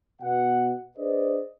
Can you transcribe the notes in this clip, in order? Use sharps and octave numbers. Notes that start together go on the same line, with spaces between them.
B2 F#5
D4 G#4 B4 C5 D5 D#5